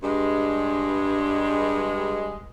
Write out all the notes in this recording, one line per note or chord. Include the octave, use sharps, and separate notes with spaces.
G2 G#3